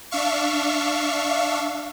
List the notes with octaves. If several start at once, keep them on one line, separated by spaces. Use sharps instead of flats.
D4 E5 F5 C#6